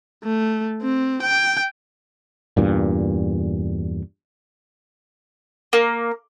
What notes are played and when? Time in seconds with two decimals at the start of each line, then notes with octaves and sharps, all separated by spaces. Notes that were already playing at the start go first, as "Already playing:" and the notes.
0.24 A3
0.82 C4
1.22 G5
2.57 E2 G2 A#2
5.73 A#3